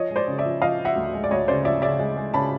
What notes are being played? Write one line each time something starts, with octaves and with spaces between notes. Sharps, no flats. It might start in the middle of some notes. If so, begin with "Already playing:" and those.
Already playing: F3 C#5 D#5
G#3
C5 D5
C#3
D5 E5
F3
F3 D#5 F5
F3
E5 F#5
D2
G#3
D5
D2 C#5 D#5
C#3 C5 D5
F3 D5 E5
C#3 D5 E5
G#3
G#3
C#3 A5 B5